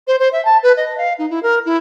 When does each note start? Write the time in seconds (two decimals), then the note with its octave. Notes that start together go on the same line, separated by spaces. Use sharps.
0.07 C5
0.19 C5
0.32 E5
0.45 A5
0.63 B4
0.77 D#5
0.98 F5
1.19 D#4
1.30 E4
1.43 A#4
1.66 E4